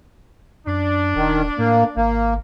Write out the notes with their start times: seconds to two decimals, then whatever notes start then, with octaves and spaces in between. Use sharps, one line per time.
0.67 F#2 D4
1.15 D#1 D#3
1.58 A2 A#3
1.96 G#1 A#3